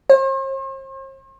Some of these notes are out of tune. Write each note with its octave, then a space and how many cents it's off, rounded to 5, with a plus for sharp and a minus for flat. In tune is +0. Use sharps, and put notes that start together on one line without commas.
C5 +45